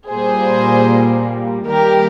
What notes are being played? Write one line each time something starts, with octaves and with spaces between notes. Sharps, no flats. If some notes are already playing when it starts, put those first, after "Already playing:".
A#2 G3 A#3 G#4 C5
D#3 G3 A#3 G4 A#4